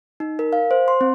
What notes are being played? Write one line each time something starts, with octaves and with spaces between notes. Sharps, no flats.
D#4
A#4
F5
C5
C6
C4